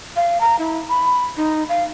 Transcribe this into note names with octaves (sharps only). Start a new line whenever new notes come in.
F5
A#5
E4
B5
D#4
F5